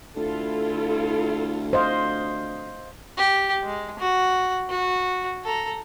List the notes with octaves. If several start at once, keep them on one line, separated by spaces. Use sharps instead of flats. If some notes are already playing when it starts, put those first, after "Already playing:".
D2 E4 F4 A4
C5 D#5 F5
G4
G#3
F#4
F#4
A4 A#5